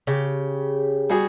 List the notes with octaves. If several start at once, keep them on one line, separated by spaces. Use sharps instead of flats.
C#3 G4
G3 F#4 G#4